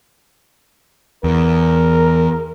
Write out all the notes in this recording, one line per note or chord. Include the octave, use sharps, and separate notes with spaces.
E2 A#4